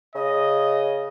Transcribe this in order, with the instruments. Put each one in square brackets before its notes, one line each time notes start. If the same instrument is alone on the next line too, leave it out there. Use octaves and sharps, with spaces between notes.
[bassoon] C#3 [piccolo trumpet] D#5